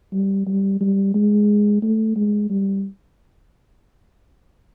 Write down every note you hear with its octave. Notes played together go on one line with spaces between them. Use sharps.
G3
G3
G3
G#3
A3
G#3
G3